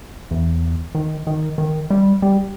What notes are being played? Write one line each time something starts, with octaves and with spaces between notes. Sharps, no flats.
E2
D#3
D#3
D#3
G3
G3